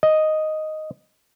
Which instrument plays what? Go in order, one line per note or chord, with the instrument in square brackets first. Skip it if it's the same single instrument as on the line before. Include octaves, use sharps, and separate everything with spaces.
[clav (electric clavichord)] D#5